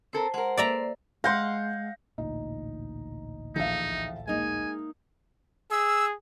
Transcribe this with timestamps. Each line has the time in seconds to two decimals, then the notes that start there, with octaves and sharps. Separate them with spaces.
0.13 C4 A4 A#4 C5
0.34 G#3 A#4 C5 F#5
0.57 A#3 A4 C5 D5 E5 A#5
1.24 G#3 F5 F#5 C6 G6 A#6
2.18 A1 D2 A#2 D#4
3.56 A#1 E3 D#4 A4 E5 F5
4.27 G#3 A#3 D#4 G#5
5.71 G#4 E6